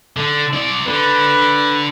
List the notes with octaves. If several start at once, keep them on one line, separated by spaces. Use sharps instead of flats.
D3
C4 D5
D3 B4